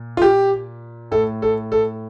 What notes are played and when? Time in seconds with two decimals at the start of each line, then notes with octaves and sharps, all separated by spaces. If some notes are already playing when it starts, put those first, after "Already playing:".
Already playing: A#2
0.17 F4
0.22 G4
1.11 A2 A4
1.42 A4
1.72 A4